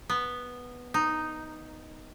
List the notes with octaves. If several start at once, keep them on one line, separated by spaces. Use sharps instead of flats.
B3
D#4